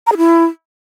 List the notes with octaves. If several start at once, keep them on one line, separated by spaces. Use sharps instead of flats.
A#5
G#4
E4